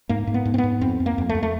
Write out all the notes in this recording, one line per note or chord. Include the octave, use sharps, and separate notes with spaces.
G#2 A#3
G#2
B3
G#2
C4
B3
G#2
F2 C4
F2
A#3
F2
A3
F2
A3